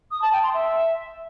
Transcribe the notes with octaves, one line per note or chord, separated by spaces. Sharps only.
D#6
A5
G5
C6
E5